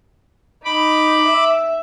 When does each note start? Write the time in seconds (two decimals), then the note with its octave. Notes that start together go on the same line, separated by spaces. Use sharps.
0.65 D#4 B5 D6
1.27 E5